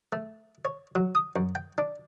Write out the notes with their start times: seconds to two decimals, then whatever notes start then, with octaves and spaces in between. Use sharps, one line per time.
0.13 A3
0.65 C#5
0.95 F#3
1.15 D#6
1.36 F#2
1.55 G5
1.78 D4